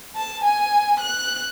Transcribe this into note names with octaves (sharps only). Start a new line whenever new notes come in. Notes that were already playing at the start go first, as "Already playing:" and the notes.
A5
G#5
F#6